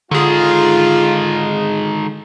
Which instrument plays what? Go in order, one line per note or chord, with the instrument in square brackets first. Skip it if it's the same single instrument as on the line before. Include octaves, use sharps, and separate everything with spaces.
[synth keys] D3 G#4 [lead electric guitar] D#3 G#3 [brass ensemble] F4